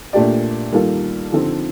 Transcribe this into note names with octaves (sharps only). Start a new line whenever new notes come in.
A#2 A3 D4 G4 D5
D#3 G3 A#3 F4 A4
D3 F3 C4 D#4 A4